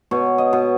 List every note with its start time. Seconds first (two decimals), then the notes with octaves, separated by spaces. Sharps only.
0.11 B2 C#5
0.38 D#5
0.53 B2